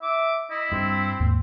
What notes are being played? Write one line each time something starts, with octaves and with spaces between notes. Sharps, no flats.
E5 D6
E4 D#5
G2 C4
D#2 G#2 A#3